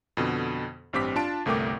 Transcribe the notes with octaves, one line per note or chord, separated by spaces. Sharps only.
F2 B2 D3
A1 G2 C4 G4 D6 B6
D4 F4 A5 D7
G1 C2 A3 A#4 G5 D6